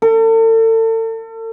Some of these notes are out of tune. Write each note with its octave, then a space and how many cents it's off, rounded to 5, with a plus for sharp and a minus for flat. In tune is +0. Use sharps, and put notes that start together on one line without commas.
A4 +40